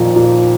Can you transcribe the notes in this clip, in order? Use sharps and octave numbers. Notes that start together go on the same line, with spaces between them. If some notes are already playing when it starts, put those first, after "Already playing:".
Already playing: F2 A#2 D#3 F3
A#2